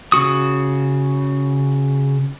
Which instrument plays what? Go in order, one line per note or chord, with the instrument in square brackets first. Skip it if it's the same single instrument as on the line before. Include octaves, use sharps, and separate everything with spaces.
[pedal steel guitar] C#3 C4 F#4 D#6